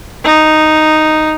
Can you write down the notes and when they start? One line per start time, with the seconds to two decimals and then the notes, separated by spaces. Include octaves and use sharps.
0.24 D#4